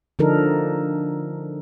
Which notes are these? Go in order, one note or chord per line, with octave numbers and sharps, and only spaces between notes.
D3 F3 D4 D#4 A4 A#4